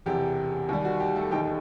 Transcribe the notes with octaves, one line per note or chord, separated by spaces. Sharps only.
E1 E2 C3 G4
D#2 D#3 G3
F#4
G4
A3 A4
E1 D#2 D#3 A3 D#4 G4 G5